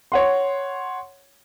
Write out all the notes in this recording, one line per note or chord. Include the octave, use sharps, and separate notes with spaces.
C#5 F#5 C6